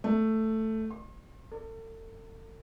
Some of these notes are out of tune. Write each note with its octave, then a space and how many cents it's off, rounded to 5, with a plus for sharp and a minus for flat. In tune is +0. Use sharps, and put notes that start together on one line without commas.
A3 +5
C6 +40
A4 +40